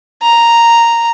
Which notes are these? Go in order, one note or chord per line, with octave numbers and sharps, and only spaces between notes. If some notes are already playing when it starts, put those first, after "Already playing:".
A#5